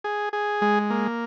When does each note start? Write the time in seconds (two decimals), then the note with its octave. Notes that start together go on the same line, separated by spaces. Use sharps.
0.04 G#4
0.33 G#4
0.62 G#3
0.90 A#3